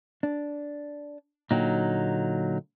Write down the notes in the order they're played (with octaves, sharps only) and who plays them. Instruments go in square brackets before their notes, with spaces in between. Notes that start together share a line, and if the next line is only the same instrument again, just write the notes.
[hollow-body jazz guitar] D4
[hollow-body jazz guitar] A#2 D3 G5 [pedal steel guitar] F#3 D#4